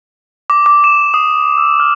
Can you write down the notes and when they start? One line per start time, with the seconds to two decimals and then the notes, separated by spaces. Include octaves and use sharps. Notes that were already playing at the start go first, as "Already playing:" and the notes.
0.50 D6
0.66 D6
0.84 E7
1.14 D#6
1.57 E6
1.80 F6